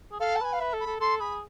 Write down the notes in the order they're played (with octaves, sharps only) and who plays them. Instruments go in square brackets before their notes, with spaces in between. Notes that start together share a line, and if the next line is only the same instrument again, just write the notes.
[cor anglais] G#4
[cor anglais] A4 [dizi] F5
[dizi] A5
[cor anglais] B4 [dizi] G#5
[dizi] F5
[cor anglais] B4 [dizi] E5
[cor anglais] A4
[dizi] B5
[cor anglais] A4
[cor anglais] A4 [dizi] C6
[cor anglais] G#4 [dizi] B5